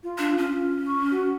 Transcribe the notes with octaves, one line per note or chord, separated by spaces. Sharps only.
F4
D4
C#4 F4
C#6
F#4